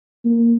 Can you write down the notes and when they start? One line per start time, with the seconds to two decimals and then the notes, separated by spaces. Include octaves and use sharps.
0.25 A#3